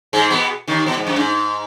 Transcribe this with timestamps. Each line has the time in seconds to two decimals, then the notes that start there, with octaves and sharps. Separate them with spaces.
0.13 G#2 G#3
0.31 B2 B3
0.68 D#2 D#3
0.87 B2
0.97 G#2
1.07 F#2
1.16 G#2